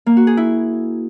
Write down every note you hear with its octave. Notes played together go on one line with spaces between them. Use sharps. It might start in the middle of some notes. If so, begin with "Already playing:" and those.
A#3
F#4
G#4
E4